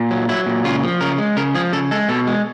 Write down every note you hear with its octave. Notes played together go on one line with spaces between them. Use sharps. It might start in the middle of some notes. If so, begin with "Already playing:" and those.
Already playing: A#2
F#3
F#3 E4
A#2
C#3 F4
F3
C#3 A#4
G#3
C#3 A#4
F3 G#4
C#3 A4
G#3 A4
B2 A4
G#3